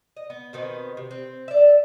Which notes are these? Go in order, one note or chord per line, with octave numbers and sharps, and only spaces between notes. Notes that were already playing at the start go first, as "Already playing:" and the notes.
D#5
B3
B2 D#3 B3 C4
C3
C4
D5 E5